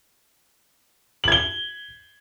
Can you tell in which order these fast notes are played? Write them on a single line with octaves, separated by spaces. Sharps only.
F#7 G#6 G7